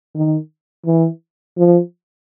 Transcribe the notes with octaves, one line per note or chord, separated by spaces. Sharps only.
D#3
E3
F3